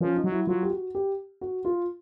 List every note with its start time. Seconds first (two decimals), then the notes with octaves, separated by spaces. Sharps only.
0.01 F3 C#4
0.16 D#4
0.24 F#3
0.31 E4
0.47 F#3 F4
0.63 G4
0.70 F#4
0.95 G4
1.41 F#4
1.65 F4